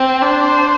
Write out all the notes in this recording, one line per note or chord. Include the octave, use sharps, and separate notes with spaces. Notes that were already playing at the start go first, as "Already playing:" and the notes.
Already playing: C4
D4 C5